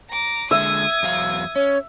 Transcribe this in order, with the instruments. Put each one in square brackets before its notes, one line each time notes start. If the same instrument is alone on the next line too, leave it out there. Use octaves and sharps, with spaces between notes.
[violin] A#5 D6
[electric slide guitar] D3 G#3 [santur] E5 [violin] D#6 G#6
[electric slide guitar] E2 F#3 F5
[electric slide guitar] C#4 [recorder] C#5